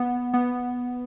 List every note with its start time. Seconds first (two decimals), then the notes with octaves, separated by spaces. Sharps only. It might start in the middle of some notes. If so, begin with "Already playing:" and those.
Already playing: B3
0.34 B3